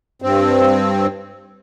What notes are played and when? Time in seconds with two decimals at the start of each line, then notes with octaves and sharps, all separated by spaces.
0.22 G2 C4